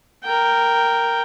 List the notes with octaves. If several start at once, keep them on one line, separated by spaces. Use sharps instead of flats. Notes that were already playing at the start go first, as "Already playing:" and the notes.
A#4 G5